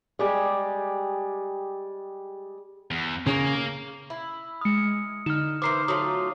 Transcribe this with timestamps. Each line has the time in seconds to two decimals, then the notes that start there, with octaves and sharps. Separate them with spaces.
0.19 G3 G#3 G4 G#4
2.91 E2
3.27 C#3 A#3
4.10 E4
4.61 G#3 D#6 F6 C#7
5.26 D3 D#4 F6 E7
5.62 E3 A#4 C5 D6 C7
5.88 F#3 A3 F4 D#6